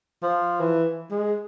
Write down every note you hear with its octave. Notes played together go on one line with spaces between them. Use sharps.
F3
E3
G#3